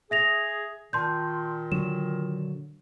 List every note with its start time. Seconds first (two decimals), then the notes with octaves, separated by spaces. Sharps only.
0.11 G#4 E5 A#6 F7
0.93 A#2 D#3 A5 C6 G6
1.72 D3 F#3 E7